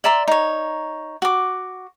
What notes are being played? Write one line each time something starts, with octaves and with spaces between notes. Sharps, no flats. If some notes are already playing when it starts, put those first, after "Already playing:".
D5 E5 A#5 C6
D#4 C#5
F#4 D6